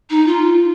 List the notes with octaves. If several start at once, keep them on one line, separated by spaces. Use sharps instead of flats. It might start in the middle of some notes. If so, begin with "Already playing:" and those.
D#4
F4